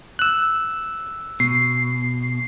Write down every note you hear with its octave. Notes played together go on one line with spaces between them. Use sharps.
E6 F#6
B2 C7